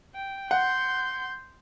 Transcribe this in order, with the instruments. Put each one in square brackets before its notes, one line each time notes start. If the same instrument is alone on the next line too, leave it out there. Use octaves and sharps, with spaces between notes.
[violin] G5
[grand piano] F#5 [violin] C6 G6